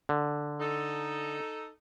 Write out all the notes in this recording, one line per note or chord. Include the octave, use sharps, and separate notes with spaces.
D3
D#4 A4